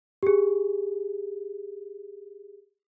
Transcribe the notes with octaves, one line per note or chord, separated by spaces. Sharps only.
G4 G#4